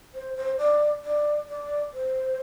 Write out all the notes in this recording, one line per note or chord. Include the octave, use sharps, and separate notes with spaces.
C5
C5
D5
D5
D5
C5